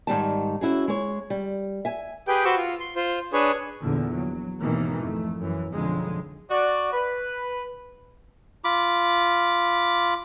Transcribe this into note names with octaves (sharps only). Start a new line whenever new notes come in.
G#2 D#3 G3 A5
C#4 E4 F#4 G#4
G#3 C#5
G3
E5 G#5
G4 G#4 B4 G5
F#4 B4 C5 C#6 D6 E6
F4
C6
F4 C5
D4 G#4 B4 C#5
A#1 E2 D3
F#3
G#1 D#2 B2 D#3 E3 A#3
F2 A3
F#2 E3
B1 F2 D3 G#3
F#4 D5
B4
F4 B5 D6